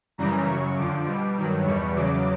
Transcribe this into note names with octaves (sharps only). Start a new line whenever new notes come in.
F#2 C#3 E3 G3 A#5
F#2 C#3 F#3 C#6
F2 D3 F3 D6
B2 G3
G2 D#3 F#3
E2 B2 G3 C#6
E2 C#3 F#3 D6